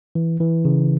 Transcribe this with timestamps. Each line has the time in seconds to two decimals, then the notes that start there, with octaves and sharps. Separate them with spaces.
0.15 E3
0.40 E3
0.65 C#3